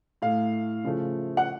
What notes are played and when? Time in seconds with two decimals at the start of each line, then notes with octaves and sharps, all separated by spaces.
0.22 A2 A3 F5
0.84 C#3 F3 A3
1.37 F#5